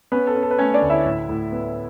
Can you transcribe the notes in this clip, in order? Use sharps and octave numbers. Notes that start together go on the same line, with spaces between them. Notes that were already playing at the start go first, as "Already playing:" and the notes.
B3 C#4 B4
A4
C#4
A4
B4
A3 C#4 C#5
D4 D5
D2
E4 E5
A2
A2
B3